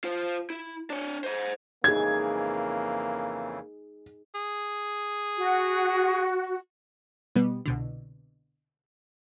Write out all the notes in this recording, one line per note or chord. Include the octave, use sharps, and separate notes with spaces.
F4 C5
E4
D4 C#5
C5 D#5
F2 C#3 E3 A#3 D#4 G#4 G#6
G#4
F#4
B2 G3 B3
C2 B2 D3